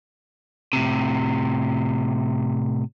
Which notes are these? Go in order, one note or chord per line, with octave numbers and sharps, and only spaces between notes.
A2 C3